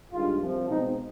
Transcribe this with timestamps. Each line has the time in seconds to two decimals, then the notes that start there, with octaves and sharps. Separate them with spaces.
0.12 G2 D#3 G#3 F4
0.41 C2 C3 F3
0.69 B2 G#3 C4 D#4